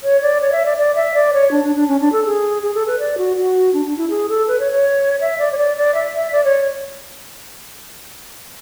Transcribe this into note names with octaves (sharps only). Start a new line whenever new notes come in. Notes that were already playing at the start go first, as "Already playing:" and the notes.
C#5
D5
C#5
E5
D5
D5
E5
D5
C#5
D4
D4
D4
C#4
D4
A4
G#4
G#4
A4
B4
D5
F#4
F#4
D4
D4
E4
G#4
A4
B4
C#5
C#5
E5
D5
C#5
D5
D5
E5
E5
D5
C#5